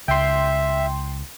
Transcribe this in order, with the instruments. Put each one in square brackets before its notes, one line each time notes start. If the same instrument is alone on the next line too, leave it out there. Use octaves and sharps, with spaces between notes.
[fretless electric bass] C#2 [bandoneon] E5 [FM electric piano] G5 C6